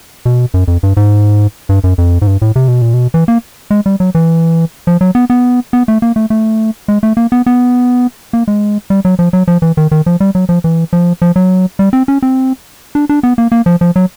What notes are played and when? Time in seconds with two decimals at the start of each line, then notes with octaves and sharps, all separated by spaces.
0.25 B2
0.54 F#2
0.68 F2
0.83 G2
0.97 G#2
1.69 G2
1.84 F#2
1.98 F2
2.22 G#2
2.27 G2
2.42 A2
2.56 C3
2.68 B2
2.82 A#2
2.94 B2
3.14 E3
3.28 A#3
3.71 G#3
3.86 G3
4.00 F#3
4.15 E3
4.87 F3
5.01 F#3
5.15 B3
5.30 B3
5.73 B3
5.88 A3
6.02 A#3
6.16 A3
6.30 A3
6.88 G#3
7.03 A3
7.17 A#3
7.32 B3
7.46 B3
8.33 A#3
8.48 G#3
8.90 G3
9.05 F#3
9.19 F3
9.33 F#3
9.48 F3
9.62 E3
9.77 D#3
9.91 D#3
10.06 F3
10.20 G3
10.35 F#3
10.49 F3
10.64 E3
10.93 F3
11.22 F3
11.36 F#3
11.79 G3
11.93 C4
12.08 C#4
12.22 C4
12.95 D4
13.09 D4
13.23 B3
13.38 A#3
13.52 A#3
13.66 F3
13.81 F3
13.96 F#3